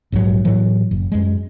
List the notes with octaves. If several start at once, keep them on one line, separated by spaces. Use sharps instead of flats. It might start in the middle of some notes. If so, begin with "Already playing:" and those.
A#1 G#2 C#3 F#3
A2 E3 F#3
F#1
F#2 G#3